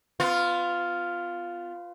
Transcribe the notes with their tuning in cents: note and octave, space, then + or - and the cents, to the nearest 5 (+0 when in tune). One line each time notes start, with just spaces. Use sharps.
B3 +35 F4 +0